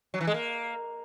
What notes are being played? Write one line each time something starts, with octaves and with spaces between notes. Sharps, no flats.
F#3
E3
G#3
A#3